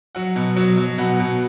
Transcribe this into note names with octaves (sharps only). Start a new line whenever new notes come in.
F#3 F#5
B2
F#3
F#3
B2 F#5
B2